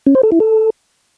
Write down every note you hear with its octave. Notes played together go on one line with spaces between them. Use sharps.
C#4
C5
A4
E4
A4